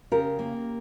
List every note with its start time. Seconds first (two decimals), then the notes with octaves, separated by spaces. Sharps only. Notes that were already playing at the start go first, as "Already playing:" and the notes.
0.12 C#3 G4 A#4
0.39 A#3